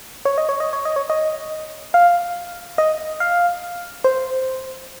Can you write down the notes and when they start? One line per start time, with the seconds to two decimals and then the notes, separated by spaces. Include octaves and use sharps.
0.25 C#5
0.38 D#5
0.49 C#5
0.60 D#5
0.73 C#5
0.85 D#5
0.96 C#5
1.10 D#5
1.94 F5
2.78 D#5
3.20 F5
4.04 C5